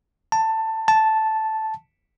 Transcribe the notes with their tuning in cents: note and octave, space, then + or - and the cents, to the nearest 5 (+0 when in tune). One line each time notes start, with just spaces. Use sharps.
A5 +15
A5 -5